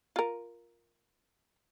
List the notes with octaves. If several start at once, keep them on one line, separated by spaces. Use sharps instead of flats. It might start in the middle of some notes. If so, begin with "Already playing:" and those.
F4 A#4